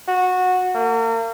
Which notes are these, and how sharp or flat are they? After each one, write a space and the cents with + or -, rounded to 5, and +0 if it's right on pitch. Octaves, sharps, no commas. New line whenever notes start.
F#4 -15
A#3 -40